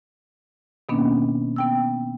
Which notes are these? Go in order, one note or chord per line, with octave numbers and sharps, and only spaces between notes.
B2 D#3 A#3 B3 C#4 D4
B3 G5 E6